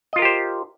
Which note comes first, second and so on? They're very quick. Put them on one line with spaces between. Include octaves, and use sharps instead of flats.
D#5 F4 A#4 G4 C5